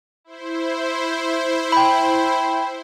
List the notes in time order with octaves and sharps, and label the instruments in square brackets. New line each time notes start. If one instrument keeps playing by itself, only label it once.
[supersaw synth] E4 C5
[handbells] G5 B5